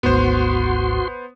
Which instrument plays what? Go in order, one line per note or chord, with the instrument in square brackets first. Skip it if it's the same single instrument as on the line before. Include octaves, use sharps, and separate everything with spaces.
[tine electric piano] G#1 D2 G#2 [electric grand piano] B3 C5 [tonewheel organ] F#4 C6